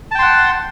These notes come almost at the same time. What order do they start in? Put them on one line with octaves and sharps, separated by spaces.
A5 G5 C6 F#5